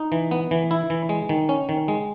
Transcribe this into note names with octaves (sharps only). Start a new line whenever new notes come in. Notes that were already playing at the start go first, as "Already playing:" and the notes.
Already playing: D#4
E3
B3
E3
E4
E3
G#3
D#3
C#4
D#3
G#3